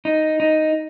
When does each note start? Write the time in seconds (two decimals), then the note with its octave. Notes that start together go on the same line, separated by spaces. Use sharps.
0.05 D#4
0.40 D#4